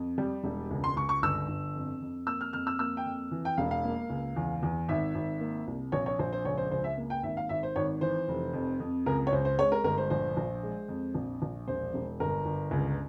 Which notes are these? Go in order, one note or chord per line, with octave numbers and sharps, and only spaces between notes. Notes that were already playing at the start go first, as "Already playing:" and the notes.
Already playing: F2
G3
E1
C#2
C6
C#2 C#6
C#6
G1 E6
G1
F2
F2
A#3 E6
F6
F2 F6
E6
A#3 E6
G5
F2
E3
G5
E1 F5
F5
A#3
C#2
E2
E2
G#1 E5
G#1
A#3
C2
A#1 C#5
C#5
A#1 C5
C5
C#2 C#5
C5
C#2 C5
E5
A#3
G5
G#1 E5
F5
G#1 E5
C5
G#1 C#5
E3 C5
F1
F2
F2
C#2 A#4
C#5
C#2 C5
C5
G#3 C#5
A#4
G1 A#4
C5
A#1 C5
A#1
G#3
F2
A#1
A#1
E1 C5
E1
G1 A#4
G1
C#2